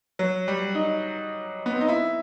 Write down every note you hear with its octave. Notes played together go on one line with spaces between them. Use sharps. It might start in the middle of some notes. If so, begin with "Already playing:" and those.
F#3
G3
D#4
B3
C4
D#4
E4